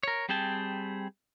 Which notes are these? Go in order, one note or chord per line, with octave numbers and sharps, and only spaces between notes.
A#4 C#5
G3 C4 G#4 G5 A5